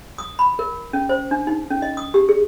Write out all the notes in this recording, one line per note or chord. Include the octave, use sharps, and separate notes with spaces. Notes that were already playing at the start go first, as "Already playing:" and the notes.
D#6
B5
A#4
C#4
C5
D4
D#4
C#4
D#5
D#6
G4
G#4